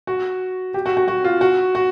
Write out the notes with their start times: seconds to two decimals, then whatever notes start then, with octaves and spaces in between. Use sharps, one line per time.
0.07 F#4
0.74 G4
0.86 F#4
0.97 F#4
1.08 F#4
1.24 F4
1.41 F#4
1.75 F#4